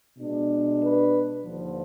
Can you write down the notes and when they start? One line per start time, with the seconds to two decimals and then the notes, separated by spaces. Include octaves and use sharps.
0.17 B2 G#3 D4
0.81 B4
1.44 D#2 D3 F3